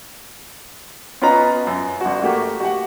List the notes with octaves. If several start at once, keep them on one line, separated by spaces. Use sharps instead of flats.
B3 C#4 F4 B4 D#5 A#5
F#2
G1 F#4
A3 A#3 F#4 G4
F#4 G4 F#5